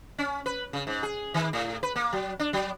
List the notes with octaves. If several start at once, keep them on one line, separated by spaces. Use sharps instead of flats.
C#4
B4
C#3
G#2
G#4
D#3
A2
B4
A#3
F#3
D4
F#3